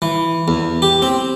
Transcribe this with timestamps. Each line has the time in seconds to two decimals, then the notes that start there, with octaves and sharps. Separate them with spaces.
0.02 E3
0.48 E2
0.82 G4
1.02 C4